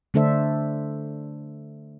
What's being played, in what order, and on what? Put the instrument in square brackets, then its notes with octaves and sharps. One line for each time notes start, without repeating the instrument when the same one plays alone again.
[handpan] D3 A3 D4 A4 C5 E5